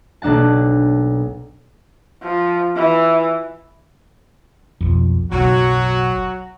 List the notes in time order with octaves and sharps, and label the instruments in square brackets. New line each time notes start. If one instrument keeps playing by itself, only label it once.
[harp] B1 A#3 D4 F#5 A5
[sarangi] F3
E3
[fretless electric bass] B1 F2
[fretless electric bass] F#1 B1 [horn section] F#3 F#4